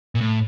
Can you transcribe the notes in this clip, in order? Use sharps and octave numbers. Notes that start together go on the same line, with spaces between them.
A#2
A2